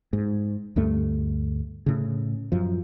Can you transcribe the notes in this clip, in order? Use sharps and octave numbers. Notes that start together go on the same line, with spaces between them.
G#2
D2 G2 A3
A2 C#3
F#2 F3